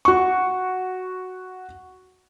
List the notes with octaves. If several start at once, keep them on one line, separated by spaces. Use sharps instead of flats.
F#4 C#6